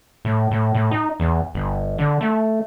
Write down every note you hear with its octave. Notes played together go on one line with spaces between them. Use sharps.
A2
A2
A2
D#4
E2
G1
D3
A3